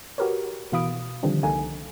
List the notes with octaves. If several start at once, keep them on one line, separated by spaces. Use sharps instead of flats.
F#4 G4 A#4 B4 C#5
B2 E3 F5 B5 D#6 D7
D3 D#3 F3 G3 C4 D4
C2 A#3 D#4 A4 G#5